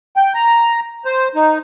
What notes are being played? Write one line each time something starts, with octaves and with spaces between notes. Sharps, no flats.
G5
A#5
C5
D#4